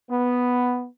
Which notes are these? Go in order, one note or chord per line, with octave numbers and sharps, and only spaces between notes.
B3